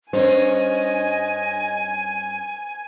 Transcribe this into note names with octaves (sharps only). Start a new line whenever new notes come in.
G2 C#4 C5 D#5 G#5